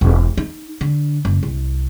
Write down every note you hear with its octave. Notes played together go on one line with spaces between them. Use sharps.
E1
D#4
D3
F#1
C2